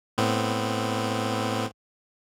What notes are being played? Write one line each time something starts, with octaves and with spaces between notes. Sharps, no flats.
A2 B3 C4